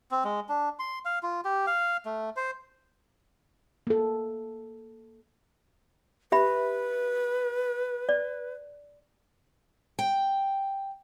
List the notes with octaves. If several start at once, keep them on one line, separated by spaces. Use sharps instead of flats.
C4
G#3
D4
C6
F5
F4
G4
F5
A3
C5
A#3 A4
G4 B4 E5 B5
D5
G5